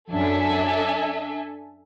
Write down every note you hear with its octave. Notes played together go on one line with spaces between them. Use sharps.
F#2 D4 A4 E5 G#5